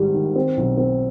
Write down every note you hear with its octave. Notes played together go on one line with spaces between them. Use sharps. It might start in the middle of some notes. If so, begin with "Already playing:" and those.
Already playing: G#1 G#2 G3
D#3
C4
B1
C4